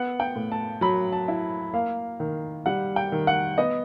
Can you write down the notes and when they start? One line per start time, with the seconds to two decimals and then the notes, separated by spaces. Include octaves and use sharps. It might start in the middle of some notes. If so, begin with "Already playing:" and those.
Already playing: B3 F#5
0.20 G5
0.36 A2
0.52 A5
0.81 F#3 B5
1.13 A5
1.28 E4
1.73 A#3 F5
2.20 D#3
2.66 G3 F#5
2.96 G5
3.12 D#3
3.27 F#5
3.58 B3 D#5